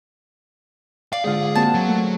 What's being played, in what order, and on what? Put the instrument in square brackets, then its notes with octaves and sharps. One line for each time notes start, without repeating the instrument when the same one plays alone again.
[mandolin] D5 [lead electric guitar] F5
[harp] G#2 D3 F4 [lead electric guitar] G#4
[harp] A#3 C4 F#4 [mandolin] A5
[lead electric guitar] F#3
[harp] A3